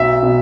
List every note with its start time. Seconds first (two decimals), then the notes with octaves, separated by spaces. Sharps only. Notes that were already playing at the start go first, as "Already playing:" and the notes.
Already playing: B1 E5
0.23 B2